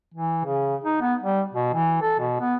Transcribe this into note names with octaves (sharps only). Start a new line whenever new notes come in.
E3
C#3
D#4
B3
G3
B2
E3
A4
B2
B3